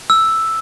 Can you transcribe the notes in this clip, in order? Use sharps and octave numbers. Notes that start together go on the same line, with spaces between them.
E6